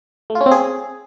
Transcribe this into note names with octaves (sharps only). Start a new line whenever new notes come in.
A3
F4
C#4
C4
G#4